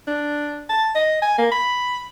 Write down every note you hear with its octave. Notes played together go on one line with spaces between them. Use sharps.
D4
A5
D#5
G#5
A#3
B5